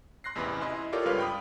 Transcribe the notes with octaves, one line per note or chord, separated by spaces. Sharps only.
C6 F#6 A#6 C7
A1 E2 C3 E3 B5
E4 D#5 C6
F4 G4 A4 A#4 C#5 D5
C#2 G2 B4 C#5 F5 F6
G5 B5 D#6